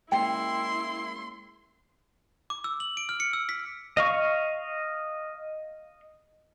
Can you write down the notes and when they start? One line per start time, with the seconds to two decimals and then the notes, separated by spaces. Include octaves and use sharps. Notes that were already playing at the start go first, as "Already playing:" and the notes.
0.12 G#3 A#3 C#4 E4 G5 C6
2.50 D6
2.64 E6
2.80 F#7
2.97 D7
3.09 F6
3.20 C#7
3.33 E6
3.49 B6
3.97 D#5 F5 C#6